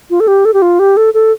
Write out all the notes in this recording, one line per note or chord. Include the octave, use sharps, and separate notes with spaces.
F4
A4
G4
A4
G4
F4
G4
A4
A4